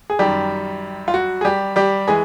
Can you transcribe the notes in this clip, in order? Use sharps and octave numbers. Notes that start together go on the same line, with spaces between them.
G#4
F#2 D#3 G3 G4
F4
F#4
G#4
G3 G4
G3 G4
E3 G#3 G#4